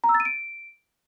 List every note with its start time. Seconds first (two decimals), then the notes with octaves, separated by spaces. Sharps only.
0.04 A#5
0.09 E6
0.14 A6
0.20 D#7
0.25 D7